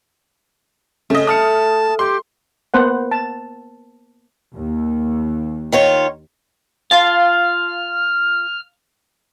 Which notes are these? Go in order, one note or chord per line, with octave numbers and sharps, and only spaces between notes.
C#3 A3 D#5
A5 D#6 F6 C#7
G4 C6
A#3 B3 C5 F#5
A5
D#2
D#3 F4 C#5
F4 F5 A5 F6